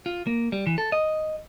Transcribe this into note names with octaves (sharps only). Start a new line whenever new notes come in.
F4
A#3
G3
E3
A4
D#5